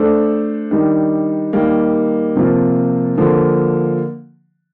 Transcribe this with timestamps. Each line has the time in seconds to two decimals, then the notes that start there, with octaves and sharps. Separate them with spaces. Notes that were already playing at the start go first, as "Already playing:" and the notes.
Already playing: A3 D4 A4 C5
0.71 D#3 G3 D4
1.53 D#3 G3 A#3
2.35 C3 F3 A#3 F4
3.18 D3 F3 A#3